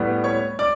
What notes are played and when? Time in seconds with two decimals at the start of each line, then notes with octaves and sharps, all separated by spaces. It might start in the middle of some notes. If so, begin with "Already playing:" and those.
Already playing: A2 G3 B3
0.24 C#5 C#6
0.59 D5 D6